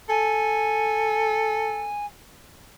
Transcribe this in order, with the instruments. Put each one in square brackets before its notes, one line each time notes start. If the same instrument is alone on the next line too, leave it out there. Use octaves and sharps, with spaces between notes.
[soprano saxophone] A4 [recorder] G#5